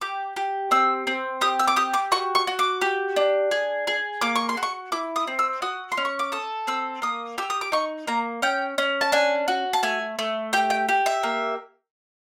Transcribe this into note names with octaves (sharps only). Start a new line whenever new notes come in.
G4 D6
G4
C4 E6
C4
G4 D#6
E6
D6
G4 D#6
D6
F#4 C#6
C#6
F#4
D6
G4
D4
G#4
G#4
A#3 D6
C#6
C6
F#4
C#6
E4 D6
D#6
C4
E6
F#4 D#6
C6
C#4
C#6
D6
A4 D#6
C4 E6
A#3 D#6
G4 E6
D#6
D6
D#4 C#6
A#3 A#5
C#4 G5
C#4
A5
D4 G#5
F#4
A5
A3 G#5
A3
G4 G5
G5
G4
E5
A#3